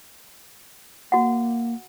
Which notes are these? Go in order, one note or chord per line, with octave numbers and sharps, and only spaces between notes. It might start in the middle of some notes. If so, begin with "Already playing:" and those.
A#3 F#4 F#5